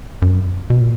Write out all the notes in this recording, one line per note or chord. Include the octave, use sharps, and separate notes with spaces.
F#2
B2
A#2